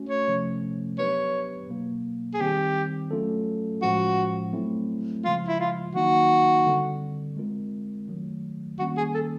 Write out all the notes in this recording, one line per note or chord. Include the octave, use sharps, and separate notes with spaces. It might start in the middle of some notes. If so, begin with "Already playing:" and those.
Already playing: A3 C#4 F#4
C#5
C3 F3 A3 C#4
F#3 B3 D4 G4 B4 C#5
B2 F#3 A#3
G#4
D#3 G3 C4 G4
F#3 A3 C#4 F4 A4
A2 F3 G#3 C#4 F4 F#4
F#3 A3 C4 E4
C#3 F3 G#3 F4
E4
F4
D#3 F#3 A#3 D#4 F#4
D3 G3 C4
G#3 C4 F4 A#4
D#3 F#3 A3
D#3 G3 A#3 C#4 F#4
G#4
A4